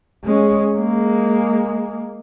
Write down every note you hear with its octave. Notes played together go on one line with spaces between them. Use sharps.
G#3 C#4
G#3 A#3